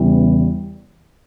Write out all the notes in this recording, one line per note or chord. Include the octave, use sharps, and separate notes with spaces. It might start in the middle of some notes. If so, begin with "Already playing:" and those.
Already playing: E2 C#3 E3 G3